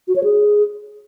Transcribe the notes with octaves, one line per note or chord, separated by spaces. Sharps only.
F#4
C#5
G#4